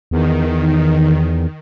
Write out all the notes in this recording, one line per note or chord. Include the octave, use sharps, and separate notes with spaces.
E2 D#3